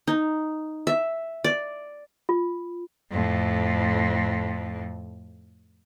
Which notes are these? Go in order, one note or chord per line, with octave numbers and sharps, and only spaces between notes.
D#4
E5
D5
F4
F2 A2